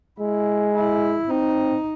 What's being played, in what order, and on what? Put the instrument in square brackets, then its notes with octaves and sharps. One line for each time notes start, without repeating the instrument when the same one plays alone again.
[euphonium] G#3 [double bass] E4
[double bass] E4
[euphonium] C4 [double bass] D#4